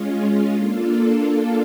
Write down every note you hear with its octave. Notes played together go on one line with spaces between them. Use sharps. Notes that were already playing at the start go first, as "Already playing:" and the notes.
Already playing: G#3 C#4 F4
A#3 D4 F4 A4